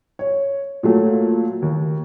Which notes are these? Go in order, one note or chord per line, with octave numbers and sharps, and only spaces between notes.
C#5
A#2 F#3 A3
D#2